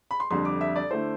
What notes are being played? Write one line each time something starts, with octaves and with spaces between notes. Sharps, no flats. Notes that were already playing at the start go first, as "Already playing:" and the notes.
B5
C6
F2 D3 G3 C6
D6
E5
D5
D3 A3 E4 C5